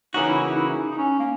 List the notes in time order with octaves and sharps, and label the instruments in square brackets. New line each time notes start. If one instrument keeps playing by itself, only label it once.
[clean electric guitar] C#3 E3 A#3 C#4 F#4 [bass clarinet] D#4
[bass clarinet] E4
D#4
E4
D#4
D#4
C#4
A#3